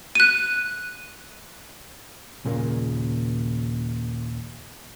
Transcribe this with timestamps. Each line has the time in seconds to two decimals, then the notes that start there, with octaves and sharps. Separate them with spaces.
0.15 F#6 D#7
2.45 D#2 A#2 C#3 A#3